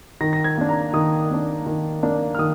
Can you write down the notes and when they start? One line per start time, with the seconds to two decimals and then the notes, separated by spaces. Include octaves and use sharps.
0.21 D#3 A#6
0.33 A#6
0.44 G#6
0.58 A#3 D4
0.69 A#5
0.93 D#3 D#6
1.30 A#3 D4
1.66 D#3
2.03 A#3 D4
2.35 F6
2.39 D#3 D#6